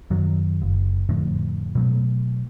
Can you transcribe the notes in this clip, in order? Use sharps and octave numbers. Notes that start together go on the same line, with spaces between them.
F#2 D#3 F#3
F#1
F2 A2 D3
B2 F#3 A3